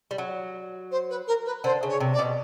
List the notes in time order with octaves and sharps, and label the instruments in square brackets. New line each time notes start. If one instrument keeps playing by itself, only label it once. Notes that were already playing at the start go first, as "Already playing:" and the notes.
[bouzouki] G3
F#3
[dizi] C5
B4
A#4
B4
[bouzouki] D3 [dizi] C5
[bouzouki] C#3
[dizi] C#5
[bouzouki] C3
[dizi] D5
[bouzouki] B2